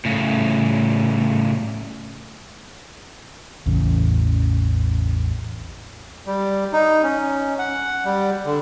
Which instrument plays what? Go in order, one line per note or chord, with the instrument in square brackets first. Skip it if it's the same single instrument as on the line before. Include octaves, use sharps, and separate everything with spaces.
[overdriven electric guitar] A2 C#3
[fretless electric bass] A1 E2 C#3
[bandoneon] G3
D#4
C#4
F#5
G3
D3